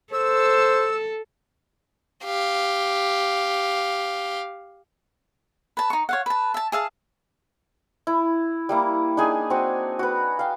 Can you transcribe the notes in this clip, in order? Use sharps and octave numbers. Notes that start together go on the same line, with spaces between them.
A4 C5 E6
G4 F5
B4 A5
D#4 C#6
C#5 F5 F#5
B4 A5
E5 A5
G#4 E5 F5 A5
E4
G3 A#3 E4
D4 D#4 G#4 G#5
C4 F#4
F#4 B4
F5 G5